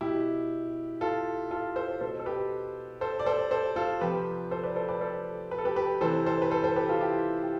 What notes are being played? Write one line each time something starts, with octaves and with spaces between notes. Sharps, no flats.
B2 E4 G4
F4 A4
F4 A4
A4 C5
B2 A4 C5
A4
G4 B4
A4 C5
D5
A4 C5
A4 C5
F4 A4
C3 F3 G4 B4
A4 C5
B4 D5
A4 C5
B4 D5
A4 C5
B4
A4
G4 B4
G4 B4
C3 E3 A4 C5
A4 C5
B4
A4 C5
A4 C5
G4 B4
F4 A4
E4 G4
G4